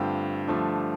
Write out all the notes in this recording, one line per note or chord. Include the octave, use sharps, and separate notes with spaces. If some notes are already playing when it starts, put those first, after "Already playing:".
Already playing: G2 D3 A3 C4 F4 G5
G2 D3 F3 A3 D4